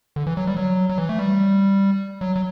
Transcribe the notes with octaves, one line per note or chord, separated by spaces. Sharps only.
D3
E3
F#3
G3
F#3
F#3
E3
A3
G3
F#3
F#3